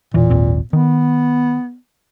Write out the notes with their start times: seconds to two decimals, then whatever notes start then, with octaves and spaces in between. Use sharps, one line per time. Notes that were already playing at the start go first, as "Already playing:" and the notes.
0.14 E1 A#2 E3
0.30 G#1 D#2 C4
0.73 D#3 B3